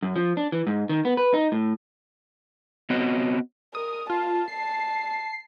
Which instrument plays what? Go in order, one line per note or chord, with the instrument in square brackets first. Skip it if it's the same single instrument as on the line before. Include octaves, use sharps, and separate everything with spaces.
[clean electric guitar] F#2
F3
D4
E3
G#2
D#3
B3
B4
D#4
A2
[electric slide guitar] B3 C4 F#4 C#5 D#5
[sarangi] A#4 [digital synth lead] D#6
[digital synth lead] F4 [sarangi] A5
[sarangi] A5 [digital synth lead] C7